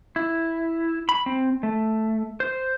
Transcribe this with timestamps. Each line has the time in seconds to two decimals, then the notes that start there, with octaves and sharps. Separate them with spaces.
0.16 E4
1.09 B5
1.26 C4
1.63 A3
2.40 C5